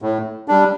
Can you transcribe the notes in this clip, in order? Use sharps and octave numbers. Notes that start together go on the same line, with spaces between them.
A2
G3 D4